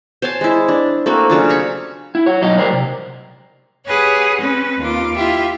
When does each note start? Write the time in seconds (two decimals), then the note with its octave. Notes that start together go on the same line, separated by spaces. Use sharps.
0.22 C5 C#5 G#5 A5
0.41 G#3 E4
0.68 D4
1.06 A3 A#3 C4 F#4
1.30 C#3 F#3 D4 F4
1.49 C#5 A#5 B5 C#6
2.15 E4
2.26 F#4 C#5
2.42 B1 G2 F#3 D#4 D#5
2.58 G3 G#3 G#4 A#4 C5 D5
2.73 C3
3.85 G4 G#4 B4 C#5 F#5
4.40 C4 C#4 B4
4.79 D#2 F4 D6
5.14 E4 F4 G4 E5